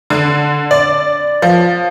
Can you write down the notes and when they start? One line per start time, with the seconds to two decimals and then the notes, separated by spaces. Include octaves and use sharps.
0.10 D3
0.71 D5
1.42 F3